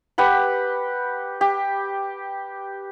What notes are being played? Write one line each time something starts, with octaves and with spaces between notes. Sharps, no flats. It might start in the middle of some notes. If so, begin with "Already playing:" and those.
G4 B4 F#5 B5
G4